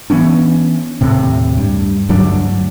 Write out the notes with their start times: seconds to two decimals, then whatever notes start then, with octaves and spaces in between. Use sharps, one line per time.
0.10 E3 B3 C#4 D4
1.01 D#2 A2 C3
1.58 G2
2.09 D2 G2 F#3 D4